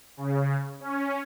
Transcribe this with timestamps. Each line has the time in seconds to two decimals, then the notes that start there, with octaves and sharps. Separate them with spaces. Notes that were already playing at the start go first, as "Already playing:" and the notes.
0.17 C#3
0.80 C#4